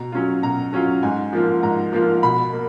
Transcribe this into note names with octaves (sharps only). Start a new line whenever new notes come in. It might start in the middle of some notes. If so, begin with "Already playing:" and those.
Already playing: B2 A#5
F#3 C#4 F4
B2 A#5
F#3 C#4 F4
G#2 G#5
F3 A#3 F4
G#2 A#5
F3 A#3 F4
B2 B5
A#3